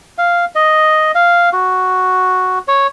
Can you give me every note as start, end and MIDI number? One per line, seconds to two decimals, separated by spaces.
0.18 0.45 77
0.55 1.12 75
1.15 1.49 77
1.53 2.59 66
2.68 2.87 73